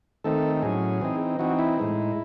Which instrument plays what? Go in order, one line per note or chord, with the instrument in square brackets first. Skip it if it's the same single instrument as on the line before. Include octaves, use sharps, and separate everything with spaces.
[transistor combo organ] D#3 A3 C4 D#4 A4
A2 F#3 C#4 G#4
E3 C4 D#4
E3 C4 D#4 F#4
E4
A2 G#3 D#4